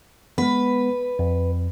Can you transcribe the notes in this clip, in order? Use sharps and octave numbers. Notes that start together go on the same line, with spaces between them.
G#3 B3 B4
F2